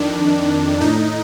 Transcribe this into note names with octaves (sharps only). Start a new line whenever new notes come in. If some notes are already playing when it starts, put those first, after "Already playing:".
Already playing: F2 D#3 D4
A2 D#4